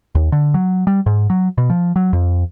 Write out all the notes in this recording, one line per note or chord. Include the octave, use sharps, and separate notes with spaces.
D#2
D3
F#3
G3
G#2
F#3
B2
F3
F#3
F2